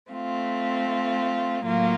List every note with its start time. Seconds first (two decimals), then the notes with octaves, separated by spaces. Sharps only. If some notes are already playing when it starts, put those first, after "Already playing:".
0.10 A3 C4 F4
1.64 A2 F#3 A#3 F4